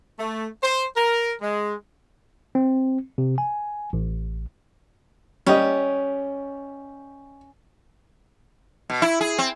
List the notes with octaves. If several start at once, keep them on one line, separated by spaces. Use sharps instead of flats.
A3
C5
A#4
G#3
C4
C3
G#5
A1
G3 C#4 G4 D#5
B2
E4
G#4
C4